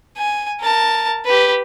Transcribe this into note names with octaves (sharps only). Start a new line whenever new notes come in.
G#5
A#4 A5
G4 B4